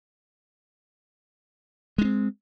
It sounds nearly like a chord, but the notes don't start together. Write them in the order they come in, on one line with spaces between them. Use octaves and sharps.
G#3 D4 C4